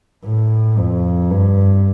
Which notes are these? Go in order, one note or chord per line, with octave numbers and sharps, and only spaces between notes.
A2
F2
G2